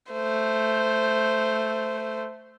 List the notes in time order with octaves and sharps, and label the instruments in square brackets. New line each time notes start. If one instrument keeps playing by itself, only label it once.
[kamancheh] A3 C5